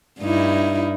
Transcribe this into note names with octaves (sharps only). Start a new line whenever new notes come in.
G2 D#4 E4